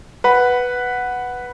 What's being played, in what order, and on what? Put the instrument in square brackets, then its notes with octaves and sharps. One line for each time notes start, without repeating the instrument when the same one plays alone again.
[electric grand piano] B4 F#5 B5